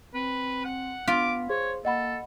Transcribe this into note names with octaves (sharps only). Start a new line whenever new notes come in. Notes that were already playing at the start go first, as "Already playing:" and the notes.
C4 B4
F#5
B3 F4 D6 B6
G#4 C5 C#5
A#3 A4 D#5 F#5 B5